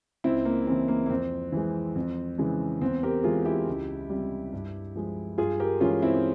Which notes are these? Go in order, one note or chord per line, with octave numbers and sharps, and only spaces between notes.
C#2 C4 E4
A#3
C#3 E3 C4
A#3
A#3
F2 C4
E3 G#3
F2
C#3 E3 G#3
E2 C4
G4 A#4
E3 G#3 F4 G#4
E4 G4
C#2
C3 G3
G2
F3 G#3
G2 F4 G#4
G4 A#4
E3 G#3 C#4 F4
C4 E4